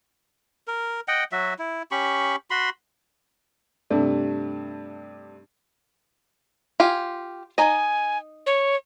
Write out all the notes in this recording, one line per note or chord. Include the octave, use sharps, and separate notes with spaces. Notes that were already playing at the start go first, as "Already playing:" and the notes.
A#4
D#5 F#5 G5
F#3 F#4 E5
E4
C#4 G4 B5 C#6
F#4 B5 C6
G2 C3 A3 D4
F4 G4 G#5
D#4 D#5 G#5
C#5